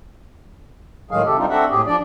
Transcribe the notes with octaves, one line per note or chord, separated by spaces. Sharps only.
A2 D#3 F#3 G#3 G#4 F5
C3 G4 A4
G3 C4 D4 D#4 F4
C4 D4 F#4 A4 E5 F#5
A2 G4 G#4
F3 D4 D5